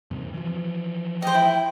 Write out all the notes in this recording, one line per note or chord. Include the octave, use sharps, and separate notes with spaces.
E2 G2 C3
E3 F3
C5 D#5 G5
E4